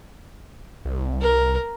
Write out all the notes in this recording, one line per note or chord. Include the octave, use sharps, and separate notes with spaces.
C2
A#4